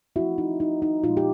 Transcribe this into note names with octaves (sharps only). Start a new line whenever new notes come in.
F3 A3 C4 E4 F#4
D#4
D#4
D#4
A#2 F3 G#3 D#4 F4
G4